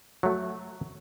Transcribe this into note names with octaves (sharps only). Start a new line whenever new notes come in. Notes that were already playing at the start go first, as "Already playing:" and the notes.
F#3 A3